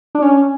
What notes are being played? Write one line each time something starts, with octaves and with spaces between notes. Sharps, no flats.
D4
C#4